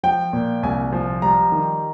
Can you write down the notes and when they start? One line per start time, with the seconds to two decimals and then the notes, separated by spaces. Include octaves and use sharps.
0.03 F3 G5
0.33 A#2
0.63 C2 G#5
0.92 F3
1.22 G3 A#5
1.52 D#3